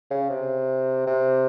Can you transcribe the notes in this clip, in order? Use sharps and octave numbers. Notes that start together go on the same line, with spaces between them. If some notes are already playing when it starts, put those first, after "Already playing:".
C#3
C3
C3